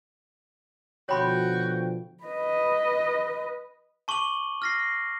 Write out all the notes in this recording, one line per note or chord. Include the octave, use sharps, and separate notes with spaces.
B2 D3 F3 F#4 C#5 G5 B5 C6
B4 D#5
A5 C#6 D6 D#7 F#7 G7
F6 A#6 C7